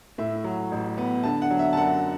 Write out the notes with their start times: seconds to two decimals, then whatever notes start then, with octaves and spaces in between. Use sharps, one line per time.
0.18 A2 E5
0.44 F#3
0.72 A1
0.98 B3
1.23 D3 A5
1.42 F#5
1.50 F#3
1.59 E5
1.73 A5
1.76 F#2 F#5